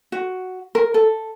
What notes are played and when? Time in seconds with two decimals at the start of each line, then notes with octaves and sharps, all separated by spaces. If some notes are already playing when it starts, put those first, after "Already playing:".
0.12 F#4
0.75 A#4
0.94 A4